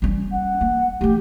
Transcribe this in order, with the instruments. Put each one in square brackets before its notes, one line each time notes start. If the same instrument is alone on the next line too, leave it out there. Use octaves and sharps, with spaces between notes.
[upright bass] G3 C#4
[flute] F#5
[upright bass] A#3
[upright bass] E3 A3 [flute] G4